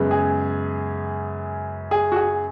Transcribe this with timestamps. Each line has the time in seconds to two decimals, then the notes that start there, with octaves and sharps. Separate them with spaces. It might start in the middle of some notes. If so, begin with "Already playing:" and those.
Already playing: F#2 C#3 G#3 B3
0.11 G#4
1.91 G#4
2.12 F#4
2.16 G#4